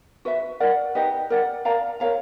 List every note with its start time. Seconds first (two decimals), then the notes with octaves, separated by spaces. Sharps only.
0.25 F#4 B4 E5
0.60 A#4 D5 F#5
0.95 D#4 G4 B4 D#5
1.30 A#4 D5 F#5
1.65 A#4 D5 F5 A#5
2.00 A#4 C#5 F5 A#5